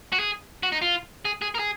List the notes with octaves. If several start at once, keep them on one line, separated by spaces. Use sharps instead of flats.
F#4
G#4
F#4
D#4
F4
G#4
G#4
A#4
G#4